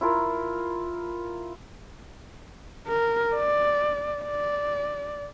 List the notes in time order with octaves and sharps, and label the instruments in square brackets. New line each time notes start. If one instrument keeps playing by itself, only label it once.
[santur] E4 F4 A#4
[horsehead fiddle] A#4
D5
D5